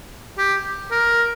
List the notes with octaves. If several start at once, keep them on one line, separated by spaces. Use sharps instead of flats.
G4
A#4